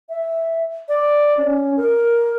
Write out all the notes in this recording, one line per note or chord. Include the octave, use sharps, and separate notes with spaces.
E5
D5
C#4
A#4